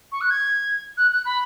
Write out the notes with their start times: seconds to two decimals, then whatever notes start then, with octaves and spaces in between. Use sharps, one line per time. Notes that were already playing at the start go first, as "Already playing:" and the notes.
0.12 C#6
0.21 F#6
0.30 G#6
0.97 F#6
1.12 F#6
1.25 B5